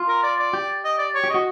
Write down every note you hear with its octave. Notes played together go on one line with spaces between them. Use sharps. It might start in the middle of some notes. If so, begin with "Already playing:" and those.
Already playing: F4
A#4
D5
D5
G4
D#5
D5
C#5
G4
F#4 D#5